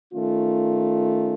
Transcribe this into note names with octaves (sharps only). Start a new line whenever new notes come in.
D#3 A3 C#4 F4